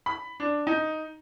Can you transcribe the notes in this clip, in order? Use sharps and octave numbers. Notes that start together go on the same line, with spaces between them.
B5
D4
D#4